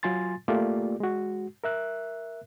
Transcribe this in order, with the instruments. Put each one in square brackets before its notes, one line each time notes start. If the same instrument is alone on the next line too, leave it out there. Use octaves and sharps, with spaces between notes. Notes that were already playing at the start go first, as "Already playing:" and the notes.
[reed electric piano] F#3 F4 G#5 C6 A6
A3 A#3 F4 G4 D5
G#3 F#4
A#4 E5 F#6